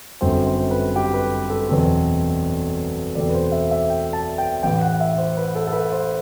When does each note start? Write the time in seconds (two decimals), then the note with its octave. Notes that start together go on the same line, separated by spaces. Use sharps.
0.21 G1 F#2 F#3 A3 C4 C5
0.47 C5
0.71 B4
0.96 G4
1.14 B4
1.50 A4
1.69 E2 B2 F#3 A3 C4
3.15 E2 B2 A3 C4 D5
3.29 B4
3.35 C5
3.52 E5
3.71 E5
3.90 G5
4.13 A5
4.38 G5
4.63 A1 A2 E3 G5
4.81 F#5
5.00 E5
5.18 C5
5.37 B4
5.55 A4
5.67 A4
5.73 B4
5.92 C5